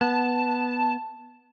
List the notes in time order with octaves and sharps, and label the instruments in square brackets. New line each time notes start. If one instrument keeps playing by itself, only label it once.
[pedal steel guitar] B3 [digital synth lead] A5